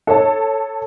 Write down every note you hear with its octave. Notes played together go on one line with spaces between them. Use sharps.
A4 C#5 A5